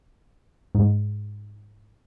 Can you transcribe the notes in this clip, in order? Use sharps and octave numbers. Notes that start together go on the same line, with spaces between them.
G#2